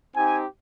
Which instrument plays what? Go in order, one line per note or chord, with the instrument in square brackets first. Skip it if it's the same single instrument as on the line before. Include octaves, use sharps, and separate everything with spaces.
[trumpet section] C4 D#4 G4 G#5